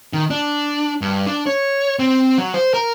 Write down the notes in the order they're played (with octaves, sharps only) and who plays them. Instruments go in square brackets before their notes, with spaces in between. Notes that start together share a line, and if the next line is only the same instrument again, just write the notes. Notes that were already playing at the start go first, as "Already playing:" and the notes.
[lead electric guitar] D#3
D4
G2
D4
C#5
C4
F#3
C5
A#4